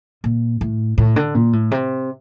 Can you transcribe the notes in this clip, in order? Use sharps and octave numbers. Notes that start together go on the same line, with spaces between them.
A#2
A2
A2
D3
A#2
A2
C3